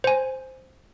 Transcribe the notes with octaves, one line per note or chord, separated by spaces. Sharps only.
C5 G#5